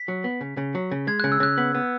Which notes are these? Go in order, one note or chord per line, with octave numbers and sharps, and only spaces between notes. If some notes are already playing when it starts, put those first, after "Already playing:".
Already playing: B6
F#3
B3
C#3
C#3
F#3
C#3
G#3 G#6
C#3 F#6
E6
C#3 F#6
B3
B3